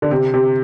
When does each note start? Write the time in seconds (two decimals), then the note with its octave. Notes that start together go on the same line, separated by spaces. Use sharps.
0.02 D3
0.11 C3
0.34 C3